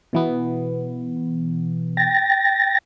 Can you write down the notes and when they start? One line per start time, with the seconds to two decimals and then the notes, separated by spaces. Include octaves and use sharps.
0.13 B2 E3 B3
1.97 G5 A6 A#6